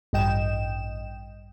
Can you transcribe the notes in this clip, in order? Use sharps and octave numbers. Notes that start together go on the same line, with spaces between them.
A1 G2 D#5 G5 E7